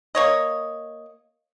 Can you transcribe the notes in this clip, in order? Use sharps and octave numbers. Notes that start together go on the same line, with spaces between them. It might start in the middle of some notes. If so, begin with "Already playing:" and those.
A#3 C#5 D#5